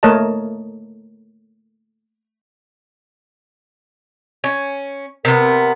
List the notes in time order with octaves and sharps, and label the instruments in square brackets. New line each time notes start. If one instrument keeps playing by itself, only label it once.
[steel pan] A3 A#3 A#4 C#5 D#5 A5
[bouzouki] C#4
[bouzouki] C3 B3 [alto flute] A#4